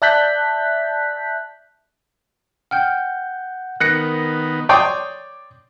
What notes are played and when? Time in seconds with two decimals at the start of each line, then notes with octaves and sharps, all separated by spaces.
0.02 D5 E5 A5 F#6 G6 B6
2.71 F#5 G5 F6 G6
3.80 D#3 B3 A#4 F#6 A#6 C#7
4.69 C#5 D5 G5 C6 D#6